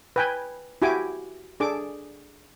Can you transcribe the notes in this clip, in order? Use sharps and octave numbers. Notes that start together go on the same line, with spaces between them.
B4 G5 G#5
E4 F#4 G4 G#5 D6
D4 G#4 A4 D6